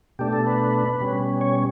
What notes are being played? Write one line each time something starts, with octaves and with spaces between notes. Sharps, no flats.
B2 A3 D4 G4
A4
B4
B2 G3 C#4
C#5